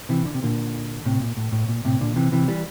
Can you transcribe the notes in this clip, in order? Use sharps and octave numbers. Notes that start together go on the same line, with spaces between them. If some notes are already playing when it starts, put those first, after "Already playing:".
C3 E3
D3
C3
A#2 D3
A2 C3
A#2
A2
A2
A#2
A2 C3
A#2 D3
C3 E3
C3 E3
E3 G3